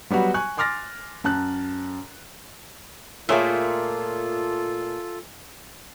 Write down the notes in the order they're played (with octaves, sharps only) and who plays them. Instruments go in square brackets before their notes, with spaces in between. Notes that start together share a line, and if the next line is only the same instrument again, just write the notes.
[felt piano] F#3 G3 B3 F#4
G#5 C#6 F#6
G#5 C6 D6 F6 A6 A#6
F#2 A5 F#6
[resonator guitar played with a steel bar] A#2 A3 A#3 [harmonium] F4 A4 [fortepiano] G#4 C#5 E5